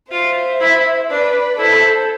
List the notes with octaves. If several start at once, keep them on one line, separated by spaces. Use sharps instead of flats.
F4 C5 E5
E4
D4 B4 D5
E4 A4 C5